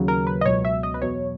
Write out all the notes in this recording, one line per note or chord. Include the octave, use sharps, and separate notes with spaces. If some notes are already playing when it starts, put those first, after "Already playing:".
Already playing: D#2 C#3 F#3
A#4
B4
D#5
C#2 B2 F#3 C#5
E5
D#5
B4
E2 B2 F#3 C#5